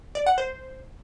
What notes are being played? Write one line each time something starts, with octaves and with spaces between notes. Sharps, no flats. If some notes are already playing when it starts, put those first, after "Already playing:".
D5
F#5
C5